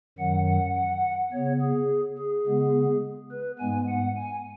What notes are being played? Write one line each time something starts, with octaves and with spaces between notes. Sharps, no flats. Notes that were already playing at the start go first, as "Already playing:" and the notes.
F#2 D#3 F#3 F#5
F#5
F#5
C#3 B3 C#5
G#4
G#4
C#3 G#3 B3
B4
G#2 G#3 B3 G#5
F#5
G#5